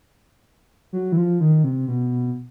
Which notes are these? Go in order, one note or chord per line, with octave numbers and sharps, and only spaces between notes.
F#3
E3
F3
D#3
C3
B2